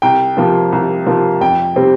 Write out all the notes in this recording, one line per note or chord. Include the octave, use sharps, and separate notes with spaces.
C2 G5
C3 F3 A#3
C2
C3 F3 A#3
F2 G5
C3 G3 C4